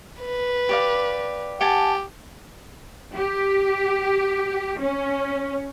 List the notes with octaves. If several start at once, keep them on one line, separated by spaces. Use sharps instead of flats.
B4
G4 D5 F5
G4 F#5 G#5 A5
G4
C#4